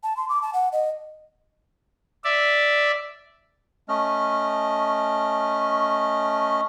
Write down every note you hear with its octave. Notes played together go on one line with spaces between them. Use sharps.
A5
C6
D6
A5
F#5
D#5
D5 E5
A3 C#4 D#5 F6